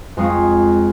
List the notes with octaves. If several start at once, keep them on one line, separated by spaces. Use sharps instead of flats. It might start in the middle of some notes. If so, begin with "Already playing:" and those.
F2 G#3 C6 C#6 D#6